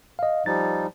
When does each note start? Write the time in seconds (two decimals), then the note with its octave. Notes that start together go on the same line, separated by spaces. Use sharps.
0.19 D#5 F5
0.46 F3 G3 D#4 A6